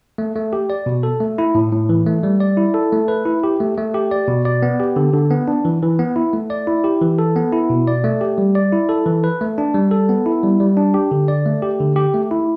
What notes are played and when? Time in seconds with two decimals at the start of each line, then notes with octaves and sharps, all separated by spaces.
0.18 A3
0.36 A3
0.53 G4
0.70 D5
0.86 B2
1.03 A4
1.20 A3
1.38 E4
1.55 A2
1.72 A2
1.89 E3
2.06 A3
2.23 G3
2.40 D5
2.57 E4
2.74 A4
2.92 A3
3.08 B4
3.25 E4
3.44 G4
3.60 A3
3.77 A3
3.94 G4
4.11 D5
4.28 B2
4.45 D5
4.62 B3
4.80 G4
4.96 D3
5.13 D3
5.31 B3
5.48 D4
5.65 E3
5.82 E3
5.99 B3
6.16 E4
6.33 A3
6.50 D5
6.67 E4
6.84 G4
7.02 E3
7.19 A4
7.36 B3
7.53 E4
7.70 B2
7.87 D5
8.04 A3
8.21 G4
8.38 G3
8.55 D5
8.73 E4
8.89 A4
9.06 E3
9.24 B4
9.41 A3
9.58 D4
9.74 G3
9.91 A4
10.09 B3
10.26 E4
10.43 G3
10.60 G3
10.77 D4
10.94 G4
11.11 D3
11.28 D5
11.46 A3
11.62 G4
11.80 D3
11.96 G4
12.14 A3
12.31 E4